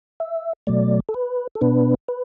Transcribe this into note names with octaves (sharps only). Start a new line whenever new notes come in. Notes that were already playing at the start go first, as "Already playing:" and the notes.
E5
B2 F#3 A3 D5
A4
B4
A4
B2 B3 D4 B4
B4